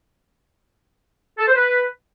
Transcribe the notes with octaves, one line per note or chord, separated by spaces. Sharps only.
A4
C5
B4